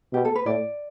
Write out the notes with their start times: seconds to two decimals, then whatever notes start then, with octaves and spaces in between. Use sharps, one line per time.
0.13 B2 G4
0.25 A4
0.35 B4
0.46 A2 D5